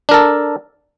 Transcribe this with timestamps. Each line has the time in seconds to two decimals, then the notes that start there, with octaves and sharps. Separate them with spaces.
0.09 D4
0.11 A#4
0.14 A4